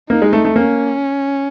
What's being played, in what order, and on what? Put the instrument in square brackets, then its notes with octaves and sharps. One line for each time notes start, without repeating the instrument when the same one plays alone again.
[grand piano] A#3 [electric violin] D#4
[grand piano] G#3
A3
A3
[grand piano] A#3 [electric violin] C#4